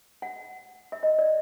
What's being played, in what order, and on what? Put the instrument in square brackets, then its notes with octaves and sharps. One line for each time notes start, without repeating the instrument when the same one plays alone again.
[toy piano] F#5
E5
D#5
D5